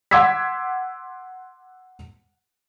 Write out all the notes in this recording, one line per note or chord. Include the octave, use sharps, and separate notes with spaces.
F#5 C6 D6 E6 G#6 B6